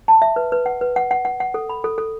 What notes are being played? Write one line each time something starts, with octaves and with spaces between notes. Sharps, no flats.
A5
E5
B4
B4
F#5
B4
F#5
F#5
F#5
F#5
A4
B5
A4
A4